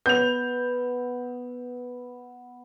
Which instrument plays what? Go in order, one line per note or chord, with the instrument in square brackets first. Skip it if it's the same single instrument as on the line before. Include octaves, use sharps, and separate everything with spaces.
[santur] B3 [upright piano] G6 F7